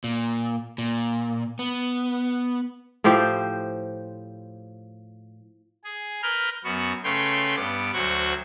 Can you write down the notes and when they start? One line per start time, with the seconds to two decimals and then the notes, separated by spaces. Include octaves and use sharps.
0.04 A#2
0.78 A#2
1.59 B3
3.04 A2 F3 G4 C5
5.84 G#4
6.22 A#4 B4 F6 G6
6.64 F#2 B3 F#4
7.04 C#3 A3 B4 C#5 G5 C6
7.56 G2 B3 D6
7.93 D2 F#3 C5 F#5 C#6